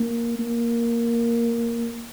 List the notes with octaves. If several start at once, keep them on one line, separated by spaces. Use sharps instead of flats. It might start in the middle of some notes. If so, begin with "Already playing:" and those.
Already playing: A#3
A#3